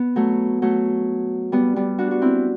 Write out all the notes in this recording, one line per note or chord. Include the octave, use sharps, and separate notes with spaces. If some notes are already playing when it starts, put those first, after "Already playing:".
Already playing: B3
F#3 A3
F#3 A3
G3 B3
G3 B3
D4 F#4
F#4
C4 E4